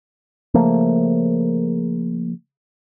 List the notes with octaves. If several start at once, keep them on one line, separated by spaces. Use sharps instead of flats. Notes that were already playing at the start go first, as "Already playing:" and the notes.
C#3 F3 A3 A#3